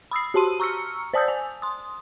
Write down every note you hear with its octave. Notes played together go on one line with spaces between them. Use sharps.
B5 D#6 E6 C7
F#4 G4 A5 C6 D#7
A#5 C#6 E6 F6 C#7
C5 D5 A5 D#6 E6 G6
G#5
C6 D#6